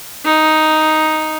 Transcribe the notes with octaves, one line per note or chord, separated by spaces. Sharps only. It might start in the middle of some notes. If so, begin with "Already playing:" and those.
D#4